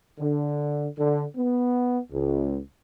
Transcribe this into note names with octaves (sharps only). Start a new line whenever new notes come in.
D3
D3
B3
C#2